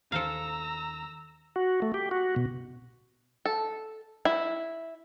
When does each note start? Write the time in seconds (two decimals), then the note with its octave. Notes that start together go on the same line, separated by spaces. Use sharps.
0.12 D#2 D#3 A4 C5 F5 A#5 E6
1.56 F#4
1.82 A3
1.94 G4
2.11 F#4
2.36 B2
3.45 A4
4.25 E4